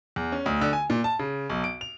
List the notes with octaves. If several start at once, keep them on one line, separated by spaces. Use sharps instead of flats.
E2
C#4
D2
D3
G#5
A#2
A5
C#3
B1
D7
F7